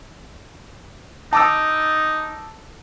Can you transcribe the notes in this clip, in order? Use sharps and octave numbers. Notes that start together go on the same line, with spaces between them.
D#4 A5 D6 E6